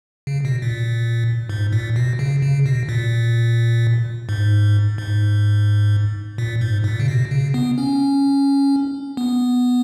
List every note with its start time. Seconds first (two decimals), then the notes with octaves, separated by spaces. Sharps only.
0.27 C#3
0.45 B2
0.62 A#2
1.49 G#2
1.73 A#2
1.96 B2
2.19 C#3
2.42 C#3
2.66 B2
2.89 A#2
4.29 G#2
4.98 G#2
6.38 A#2
6.61 G#2
6.84 A#2
7.00 C#3
7.08 B2
7.31 C#3
7.54 B3
7.78 C#4
9.17 B3